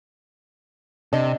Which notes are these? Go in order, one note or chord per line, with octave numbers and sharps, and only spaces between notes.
C3 D4 D#5